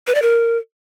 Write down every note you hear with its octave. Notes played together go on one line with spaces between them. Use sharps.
B4
D5
A#4